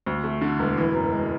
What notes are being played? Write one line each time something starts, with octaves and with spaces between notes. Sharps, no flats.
D2
A3
D3
E1
E3
F#2
G#3